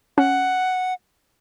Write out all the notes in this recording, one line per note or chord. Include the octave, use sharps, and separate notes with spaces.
C#4 F#5